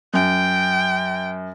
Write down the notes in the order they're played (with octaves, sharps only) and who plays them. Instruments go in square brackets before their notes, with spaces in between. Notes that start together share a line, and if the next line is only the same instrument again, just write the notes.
[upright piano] F#2 [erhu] G5